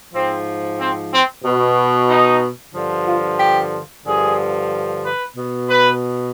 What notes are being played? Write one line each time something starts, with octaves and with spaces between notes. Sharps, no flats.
G#2 F3 C4
C4
C4
B2
D#4
G2 D3 F3
F4
G4
G2 D3 F3 G#4
B4
B2
B4